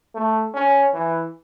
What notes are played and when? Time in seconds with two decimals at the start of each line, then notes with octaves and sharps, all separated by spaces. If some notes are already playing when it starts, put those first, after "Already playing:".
0.15 A3
0.54 C#4
0.94 E3